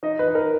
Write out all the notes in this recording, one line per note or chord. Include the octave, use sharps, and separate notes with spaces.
D#4 D#5
B4
D#4
A#4